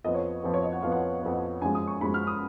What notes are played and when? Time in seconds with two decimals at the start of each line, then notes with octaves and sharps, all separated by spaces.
0.04 F2 F3 B3 D#5
0.14 C#5
0.43 F2 F3 B3 B4
0.54 C#5
0.63 D#5
0.72 F#5
0.82 F2 F3 B3 F5
0.92 F#5
1.22 F2 F3 B3
1.62 F#2 F3 G#3 G#5
1.75 D#6
1.87 C#6
2.01 F#2 F3 G#3 B5
2.14 F6
2.27 D#6